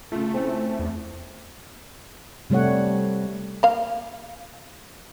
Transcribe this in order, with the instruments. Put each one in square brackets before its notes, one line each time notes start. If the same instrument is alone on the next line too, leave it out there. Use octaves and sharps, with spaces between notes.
[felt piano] C#3 F4 [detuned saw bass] A3
[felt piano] C4 C#4 E4
[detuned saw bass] E2
[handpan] C3 G3 A3 C#5 F#5
[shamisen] A#3 F5